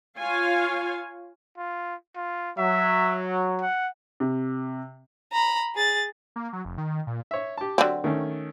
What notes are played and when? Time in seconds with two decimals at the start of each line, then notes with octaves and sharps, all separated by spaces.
0.19 F4 C#5 F5 G#5
1.57 F4
2.16 F4
2.58 F#3 E5
3.62 F#5
4.20 C3
5.33 A#5 B5
5.75 G#4 A6
6.36 A#3
6.53 F#3
6.65 F1
6.78 D#3
7.07 A#2
7.31 C#5 E5
7.57 G4 A5
7.78 D3 F#3 C4
8.04 D#3 A3 C#4